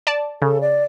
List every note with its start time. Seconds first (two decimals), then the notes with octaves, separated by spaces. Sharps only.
0.07 D5 A5
0.42 C#3 A4
0.61 D5